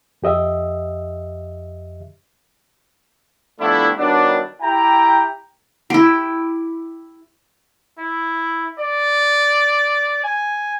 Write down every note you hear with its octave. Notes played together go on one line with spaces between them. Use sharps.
F2 G4 D#5 E5
F3 G3 A3 B3 D4 E4
D#3 F#3 G3 B3 D4
E4 G4 G5 A#5
E4 G4
E4
D5
G#5